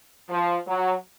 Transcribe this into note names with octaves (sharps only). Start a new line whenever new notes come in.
F3
F#3